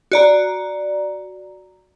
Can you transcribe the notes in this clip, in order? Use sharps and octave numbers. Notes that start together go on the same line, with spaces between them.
F#4 D5 A#5